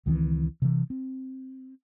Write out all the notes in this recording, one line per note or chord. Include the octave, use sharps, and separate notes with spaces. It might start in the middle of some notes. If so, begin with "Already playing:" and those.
C#2 D#3 E3 C4
C3 E3
C4